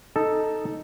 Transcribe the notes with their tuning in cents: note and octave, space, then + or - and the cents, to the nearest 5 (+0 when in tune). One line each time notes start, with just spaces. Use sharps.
D#4 +0 A4 +0